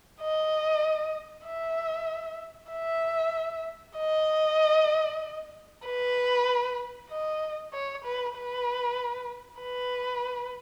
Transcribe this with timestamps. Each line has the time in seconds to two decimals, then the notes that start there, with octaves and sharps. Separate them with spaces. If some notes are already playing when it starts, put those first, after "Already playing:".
0.21 D#5
1.47 E5
2.72 E5
3.98 D#5
5.85 B4
7.10 D#5
7.73 C#5
8.05 B4
8.36 B4
9.61 B4